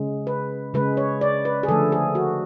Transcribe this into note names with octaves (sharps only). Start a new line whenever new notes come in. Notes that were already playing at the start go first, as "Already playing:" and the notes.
Already playing: C#3 G#3
B4
C#3 G#3 B4
C#5
D5
B4
G#4
D3 F3 A3 A4
G#4
F#4